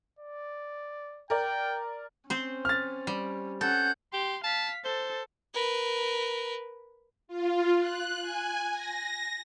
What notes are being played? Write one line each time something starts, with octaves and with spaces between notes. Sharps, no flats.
D5
A#4 D5 G5
C4 C#4 C5
F6 A6
G3
C#4 A4 F#5 G6
G4 C6
F5 A5 B6
A4 C5 A6
A#4 B4
F4
F#6
G#5
A#6